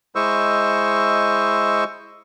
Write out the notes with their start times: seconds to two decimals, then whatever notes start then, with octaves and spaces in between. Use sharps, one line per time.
0.15 G#3 E4 C5 D#5 C#6 E6